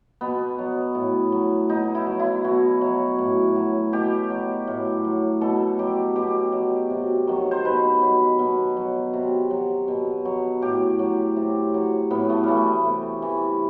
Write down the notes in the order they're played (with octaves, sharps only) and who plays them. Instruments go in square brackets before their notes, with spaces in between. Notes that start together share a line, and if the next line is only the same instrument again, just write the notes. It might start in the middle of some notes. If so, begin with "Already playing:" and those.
[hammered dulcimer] B2 B3
F#3
A2
F#3
B2 D#4
E4
F#3
E4
B2 F#4
F#3
A2
F#3
B2 G4
F#3
A2
F#3
B2 A4
F#3 G4
B2 G4
F#3
C3
D#3 F#3
C5
B2 B4
F#3
B2
F#3
C3
F#3
B2
F#3
A2 G4
F#3
C3
F#3
A2 B3
A3
E3 G3 A3
C3
E3